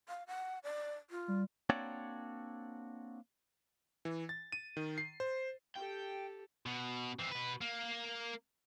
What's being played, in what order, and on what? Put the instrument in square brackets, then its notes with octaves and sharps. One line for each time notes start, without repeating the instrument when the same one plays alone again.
[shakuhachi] F5
F#5
D5
F4
[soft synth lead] G3
[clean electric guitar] A#3 C4 D4 F#4 C#5 D5
[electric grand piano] E3
A6
D#7
D#3
C7
C5
[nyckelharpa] G4 A4 [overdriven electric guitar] G5
[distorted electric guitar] B2
E3 C4
B2 B4
A#3